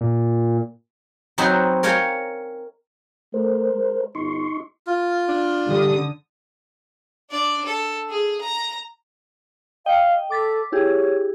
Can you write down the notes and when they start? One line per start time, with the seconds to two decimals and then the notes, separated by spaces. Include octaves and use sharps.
0.01 A#2
1.38 F#3 C4 D#4 F#4 B4 C5
1.83 A#4 C#5 F5 G5 G#5 A#5
3.34 A3 A#4 C5
3.74 G#3
4.15 G1 D#4 C6 C#6
4.87 F4
5.29 D4
5.67 D3 G3 D#6
7.30 D4 D5
7.65 A4
8.10 G#4
8.41 A#5
9.86 D#5 F5 G5
10.30 A4 D6 A6 B6
10.72 E4 G4 G#4 C#5